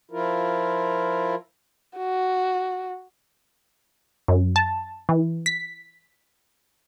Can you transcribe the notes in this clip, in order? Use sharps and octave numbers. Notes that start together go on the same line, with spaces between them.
F3 E4 F4 A#4
F#4
F#2
A5
E3
B6